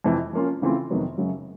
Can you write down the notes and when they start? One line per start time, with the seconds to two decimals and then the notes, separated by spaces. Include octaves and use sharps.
0.04 F2 C3 E3
0.33 F3 A#3 C#4 F4
0.62 C#3 E3 A3 C4 F4
0.90 F2 C3 D#3 F#3 B3
1.18 F#2 C#3 F#3